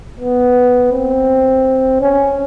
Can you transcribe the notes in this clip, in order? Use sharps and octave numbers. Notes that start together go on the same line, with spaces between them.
B3
C4
C#4